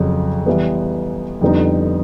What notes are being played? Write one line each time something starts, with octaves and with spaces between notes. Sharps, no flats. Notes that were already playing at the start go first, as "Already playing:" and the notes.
Already playing: F2 C#3 F#3
E3 G3 B3
F2 D3 G3 B3 D#4